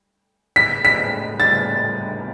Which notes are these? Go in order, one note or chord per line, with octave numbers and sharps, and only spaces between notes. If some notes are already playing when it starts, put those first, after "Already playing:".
B6
B6
A6